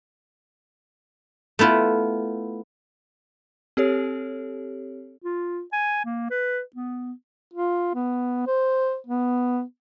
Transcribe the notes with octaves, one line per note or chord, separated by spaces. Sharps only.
A3 B3 E4 F4
C4 G4 A4 C#5
F4
G#5
A#3
B4
B3
F4
B3
C5
B3